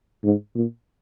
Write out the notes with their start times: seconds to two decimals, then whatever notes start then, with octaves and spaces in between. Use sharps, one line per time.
0.24 G#2
0.55 A#2